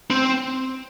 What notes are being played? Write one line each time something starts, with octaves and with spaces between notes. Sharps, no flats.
C4